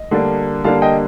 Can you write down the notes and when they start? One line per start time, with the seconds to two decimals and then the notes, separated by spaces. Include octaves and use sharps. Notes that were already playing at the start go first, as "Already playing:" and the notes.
Already playing: D#5
0.11 D3 G3 A#3 D4
0.64 D3 G3 A#3 D4 F5 A5
0.82 D#5 G5